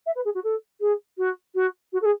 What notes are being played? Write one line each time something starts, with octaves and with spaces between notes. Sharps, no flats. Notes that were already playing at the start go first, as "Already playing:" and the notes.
E5
B4
G#4
F#4
A4
G#4
F#4
F#4
F#4
A4
G#4